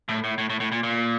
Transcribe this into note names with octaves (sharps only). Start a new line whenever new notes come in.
A2
A2
A2
A2
A2
A#2
A#2